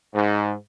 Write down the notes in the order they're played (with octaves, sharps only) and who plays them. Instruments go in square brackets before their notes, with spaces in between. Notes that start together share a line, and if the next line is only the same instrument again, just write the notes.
[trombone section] G#2